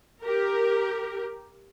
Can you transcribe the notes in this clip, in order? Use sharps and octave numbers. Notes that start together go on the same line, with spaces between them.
G4 A#4